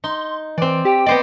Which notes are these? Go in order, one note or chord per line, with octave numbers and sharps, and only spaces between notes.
D#4 C6
E3 C4 D5
G4 G5
B3 C5 D5 D#5